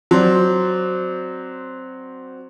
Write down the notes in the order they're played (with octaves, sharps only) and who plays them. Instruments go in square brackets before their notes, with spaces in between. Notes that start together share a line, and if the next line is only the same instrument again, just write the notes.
[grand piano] F#3 C4 C5 D5